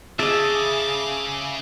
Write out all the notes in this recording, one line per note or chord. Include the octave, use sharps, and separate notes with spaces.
C#3 G#4 D#5 E5 A5 D6